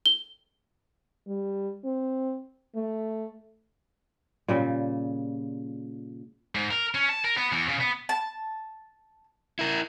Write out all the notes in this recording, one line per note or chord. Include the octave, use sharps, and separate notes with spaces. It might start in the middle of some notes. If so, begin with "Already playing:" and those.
G7
G3
C4
A3
A#2 C#3 G3
G#2
A#4
C#4
A5
A#4
B3
E2
C#3
B3
A5
E4 A#4